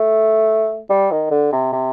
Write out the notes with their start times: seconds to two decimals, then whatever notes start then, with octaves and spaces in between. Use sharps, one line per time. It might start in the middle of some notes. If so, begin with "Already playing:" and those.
Already playing: A3
0.90 G3
1.11 D#3
1.31 D3
1.52 C3
1.73 C3